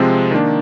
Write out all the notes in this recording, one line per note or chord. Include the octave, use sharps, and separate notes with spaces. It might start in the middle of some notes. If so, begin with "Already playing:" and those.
Already playing: C3 F3 G#3 C4
D#3 A#3 D4